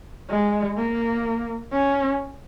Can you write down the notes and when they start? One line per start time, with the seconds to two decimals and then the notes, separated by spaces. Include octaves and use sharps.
0.30 G#3
0.77 A#3
1.73 C#4